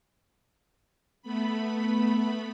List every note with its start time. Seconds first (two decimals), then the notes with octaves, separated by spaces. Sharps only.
1.22 A3 B3 B5